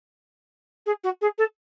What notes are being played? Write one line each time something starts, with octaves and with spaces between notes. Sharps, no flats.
G#4
F#4
G#4
A4